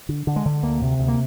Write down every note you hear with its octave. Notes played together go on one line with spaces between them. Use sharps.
D3
D3
G#3
D3
D2 A#3
C3
D2
A#3